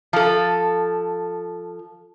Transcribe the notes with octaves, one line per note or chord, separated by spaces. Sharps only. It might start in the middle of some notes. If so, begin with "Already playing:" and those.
F3 A4